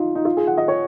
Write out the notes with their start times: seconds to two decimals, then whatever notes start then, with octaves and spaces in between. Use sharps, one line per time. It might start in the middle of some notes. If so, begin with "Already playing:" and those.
Already playing: D#4 F4
0.15 D#4
0.25 F4
0.37 G#4
0.47 F#5
0.58 D#5
0.68 C#5